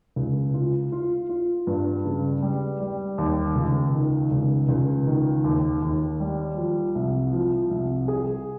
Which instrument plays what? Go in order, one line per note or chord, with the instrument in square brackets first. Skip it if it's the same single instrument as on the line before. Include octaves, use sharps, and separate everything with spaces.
[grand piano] C#2
F4
F4
F4
G2
C#3
G3
G3
D#2
C#2
D#3
C#2
C#2
D#3
D#2
D#2
G3
F3
C2
F3
C2
G#4